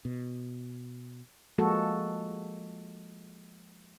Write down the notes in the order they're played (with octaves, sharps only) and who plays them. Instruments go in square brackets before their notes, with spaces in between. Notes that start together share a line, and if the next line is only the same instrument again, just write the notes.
[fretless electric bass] B2
[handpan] F3 G#3 A#3 F#4 A4